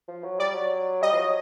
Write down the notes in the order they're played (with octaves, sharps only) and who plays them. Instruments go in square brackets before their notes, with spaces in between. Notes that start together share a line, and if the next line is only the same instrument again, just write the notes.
[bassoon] F3
F#3
[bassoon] G3 [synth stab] D5
[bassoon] F#3
[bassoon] G3 [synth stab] D#5
[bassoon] F3
F#3